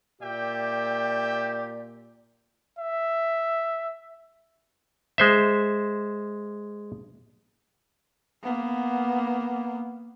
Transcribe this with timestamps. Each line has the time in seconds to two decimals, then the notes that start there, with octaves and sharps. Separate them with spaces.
0.22 A#2 G4 D5 E5 G5
2.79 E5
5.18 G#3 C5 E5
8.44 A#3 B3